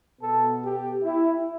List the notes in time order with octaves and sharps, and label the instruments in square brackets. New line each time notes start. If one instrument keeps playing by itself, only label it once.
[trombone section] B2 B3 A4
G4
E4